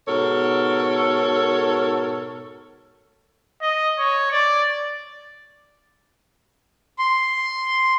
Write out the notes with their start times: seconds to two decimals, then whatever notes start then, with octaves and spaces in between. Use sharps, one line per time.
0.08 G#2 B2 A4 A#4 C#5
3.62 D#5
3.99 C#5
4.32 D5
6.99 C6